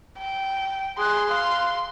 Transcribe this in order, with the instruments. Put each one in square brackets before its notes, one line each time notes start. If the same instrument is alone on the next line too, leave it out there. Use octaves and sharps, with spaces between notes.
[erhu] G5
[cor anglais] G#4 [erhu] C6 [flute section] F#6
[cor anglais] F5 [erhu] C6